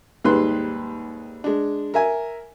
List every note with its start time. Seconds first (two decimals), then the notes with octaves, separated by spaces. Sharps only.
0.24 D#2 G#2 G3 B4 C6 F#6
1.44 G#3 D4
1.94 A#4 E5 G#5